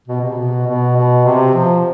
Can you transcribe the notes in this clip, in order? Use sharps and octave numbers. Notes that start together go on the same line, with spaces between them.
B2
C3
B2
B2
B2
C3
F3